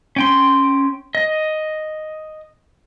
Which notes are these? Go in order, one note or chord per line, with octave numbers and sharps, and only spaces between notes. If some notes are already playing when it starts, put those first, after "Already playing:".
C#4 G5 C6
D#5